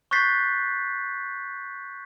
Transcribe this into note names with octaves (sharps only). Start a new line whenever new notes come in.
C#6 F#6 G6 A6 B6 C7